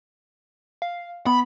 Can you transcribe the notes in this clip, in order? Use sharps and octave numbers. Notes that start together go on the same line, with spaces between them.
F5
B3 B5